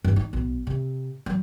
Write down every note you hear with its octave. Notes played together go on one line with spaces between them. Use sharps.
G2
D#4
B1
C3
F#3